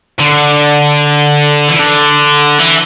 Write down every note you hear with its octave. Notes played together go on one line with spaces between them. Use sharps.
D3
E3
D3
E3